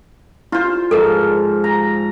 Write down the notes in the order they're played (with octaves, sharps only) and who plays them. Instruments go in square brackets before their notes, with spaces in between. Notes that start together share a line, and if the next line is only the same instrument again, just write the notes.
[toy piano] E4 [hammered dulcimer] F4 C5
[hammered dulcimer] G#2 F3 [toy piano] A4 A#4
[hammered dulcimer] A#5